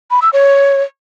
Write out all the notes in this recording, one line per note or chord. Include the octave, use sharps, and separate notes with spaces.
B5
E6
C#5